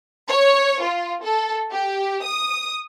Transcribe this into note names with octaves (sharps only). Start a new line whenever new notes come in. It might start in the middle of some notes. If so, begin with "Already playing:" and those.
C#5
F4
A4
G4
D#6